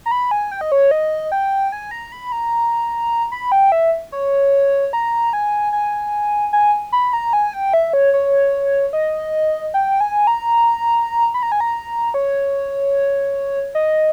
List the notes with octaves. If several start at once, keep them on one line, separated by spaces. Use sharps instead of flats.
A#5
B5
G#5
G5
D#5
C#5
D#5
G5
G#5
A#5
B5
A#5
B5
G5
E5
C#5
A#5
G#5
G#5
G#5
B5
A#5
G#5
G5
E5
C#5
C#5
D#5
G5
G#5
A#5
B5
A#5
G#5
A#5
C#5
D#5